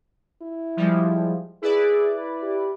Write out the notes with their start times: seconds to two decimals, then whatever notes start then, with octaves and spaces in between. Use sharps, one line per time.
0.42 E4
0.77 F3 G3 G#3
1.62 E4 G#4 B4 D5
2.42 G4